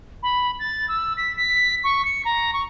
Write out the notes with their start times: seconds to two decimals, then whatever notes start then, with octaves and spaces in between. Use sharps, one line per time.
0.23 B5
0.59 A6
0.89 E6
1.17 B6
1.36 B6
1.84 C#6
2.05 C#7
2.25 A#5
2.53 C#6